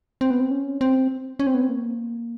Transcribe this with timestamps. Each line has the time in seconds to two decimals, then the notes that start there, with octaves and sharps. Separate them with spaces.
0.21 C4
0.30 B3
0.40 C4
0.51 C#4
0.81 C4
1.39 C#4
1.47 C4
1.54 B3
1.62 C4
1.69 A#3